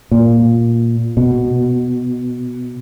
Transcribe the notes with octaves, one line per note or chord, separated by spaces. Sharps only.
A#2
B2